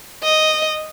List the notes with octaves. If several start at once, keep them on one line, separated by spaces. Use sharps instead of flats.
D#5